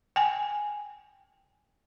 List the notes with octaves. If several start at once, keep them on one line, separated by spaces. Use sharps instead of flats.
G5 G#5